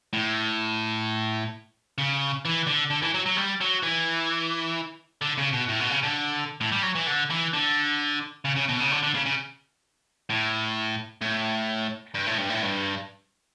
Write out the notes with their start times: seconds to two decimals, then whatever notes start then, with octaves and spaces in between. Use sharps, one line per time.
0.13 A2
1.98 C#3
2.45 E3
2.67 D3
2.90 D3
3.02 E3
3.14 F#3
3.26 F#3
3.37 G3
3.61 F#3
3.83 E3
5.22 D3
5.38 C#3
5.53 B2
5.68 A2
5.80 B2
5.90 C#3
6.03 D3
6.61 A2
6.72 G3
6.83 F#3
6.95 E3
7.07 D3
7.30 E3
7.53 D3
8.45 C#3
8.56 C#3
8.69 B2
8.80 C#3
8.91 D3
9.03 D3
9.15 C#3
9.26 C#3
10.30 A2
11.22 A2
12.14 G2
12.27 A2
12.38 G2
12.50 A2
12.63 G2